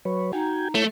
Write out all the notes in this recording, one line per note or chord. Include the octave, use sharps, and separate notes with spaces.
F#3 B4 C#5
D#4 F#4 G5 G#5
A3 E4 C#5